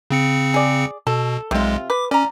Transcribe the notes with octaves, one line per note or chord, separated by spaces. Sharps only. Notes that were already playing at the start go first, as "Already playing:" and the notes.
C#3 C4 C#7
G#4 D5
B2 A4
B1 C3 G#3 F4
B4 D6
C#4 D5 A#5